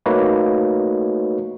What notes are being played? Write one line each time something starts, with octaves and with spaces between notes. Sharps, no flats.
A3 A#3 D#4 F#4 B4 C#5